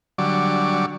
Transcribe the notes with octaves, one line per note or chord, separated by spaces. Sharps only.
D3 F#3 G3 D5 C#6 D6